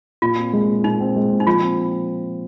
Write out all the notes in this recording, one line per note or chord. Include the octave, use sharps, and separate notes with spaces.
A#2 F4
C4
G#3
A#2
A#2 D#4
C4
G#3
A#2
D#4
F3 F4
C4